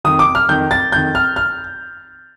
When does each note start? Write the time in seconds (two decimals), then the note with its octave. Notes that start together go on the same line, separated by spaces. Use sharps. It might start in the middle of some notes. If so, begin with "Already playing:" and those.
0.04 F2 D#3 D#6
0.19 D6
0.35 F6
0.49 F2 D#3 G6
0.71 A6
0.92 F2 D#3 G6
1.15 F6
1.36 F6